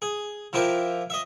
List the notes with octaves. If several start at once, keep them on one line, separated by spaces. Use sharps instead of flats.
G#4
F3 E4 F4 G4 A#4
D#5 E5